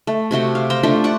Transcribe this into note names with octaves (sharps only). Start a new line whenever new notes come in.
A3
C3 A3 F#4 G5
F5
C5 F5 G5 A#5
A3 D4 F4 G4
D5 F#5 C#6